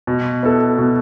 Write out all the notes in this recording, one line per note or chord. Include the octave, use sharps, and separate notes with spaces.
B2
B3 E4 A4
B2